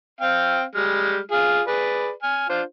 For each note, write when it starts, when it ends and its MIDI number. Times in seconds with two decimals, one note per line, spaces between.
0.21 0.63 60
0.21 0.63 77
0.21 0.63 79
0.75 1.19 55
0.75 1.19 56
0.75 1.19 89
1.31 1.61 65
1.31 1.61 68
1.31 1.61 77
1.67 2.10 68
1.67 2.10 71
1.67 2.10 74
2.23 2.46 80
2.23 2.46 89
2.49 2.62 62
2.49 2.62 65
2.49 2.62 72